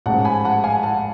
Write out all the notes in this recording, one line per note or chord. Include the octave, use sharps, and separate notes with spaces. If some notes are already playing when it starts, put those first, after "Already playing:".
A1 G#2 F3 F#5 A5
G#5 B5
F#5 A5
F5 G#5
F#5 A5